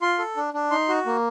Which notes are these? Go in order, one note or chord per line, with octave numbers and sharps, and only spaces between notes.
F4 C6
A4
D4
D4
D#4 C6
F#4
A#3